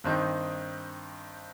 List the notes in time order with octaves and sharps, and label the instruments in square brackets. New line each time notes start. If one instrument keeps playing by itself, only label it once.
[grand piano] G2 D#3 C4 D#4